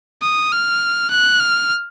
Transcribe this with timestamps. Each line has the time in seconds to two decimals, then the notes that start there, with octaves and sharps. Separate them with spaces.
0.22 D#6
0.52 F6
1.10 F#6
1.40 F6